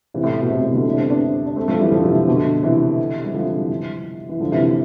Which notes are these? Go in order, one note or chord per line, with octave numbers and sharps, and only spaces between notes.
C3 E3
A2
B2
A2 C3
A2 C3
B2 D3
C3 E3
D4
A3 C4
B3 D4
D4
A3 C4
F3 A3
E3 G3
D3 F3
C3 E3
B2 D3
C3 E3
G3
D3 F3
E3 G3
E3
D3 F3
C3 E3